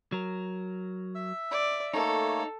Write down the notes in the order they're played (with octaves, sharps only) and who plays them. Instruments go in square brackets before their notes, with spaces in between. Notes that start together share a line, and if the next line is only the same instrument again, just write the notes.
[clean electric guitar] F#3 A#4
[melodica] E5 E6
[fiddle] D5
[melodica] A3 A#3 C#5 [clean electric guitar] D#4 [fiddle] A4